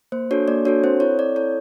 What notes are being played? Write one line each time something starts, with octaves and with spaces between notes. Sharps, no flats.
A#3 C5
D4 F#4 A4 C#5
A#3 D5
D4 F#4 A4 C#5
C4 C5
E4 A4 C#5
C4 D5
E4 A4 C#5